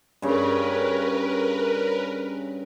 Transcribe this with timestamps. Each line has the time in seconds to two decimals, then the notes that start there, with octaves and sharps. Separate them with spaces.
0.22 G2 C#3 A#4 B4